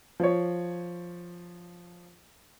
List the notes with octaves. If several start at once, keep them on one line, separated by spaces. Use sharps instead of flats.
F3 C#5